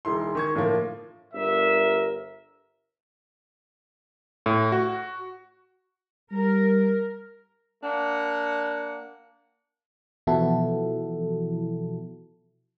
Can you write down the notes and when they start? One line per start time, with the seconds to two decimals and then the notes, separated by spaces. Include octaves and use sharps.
0.05 E1 D#4 E4 C6
0.35 D#3 C#6 G#6
0.55 A2 D3 F3 A#3
1.34 G1 A#4 E5
4.46 A2
4.72 F#4
6.31 G3 A#4
7.83 A#3 D4 F#5
10.27 B2 E3 F3 E4 F#4 A4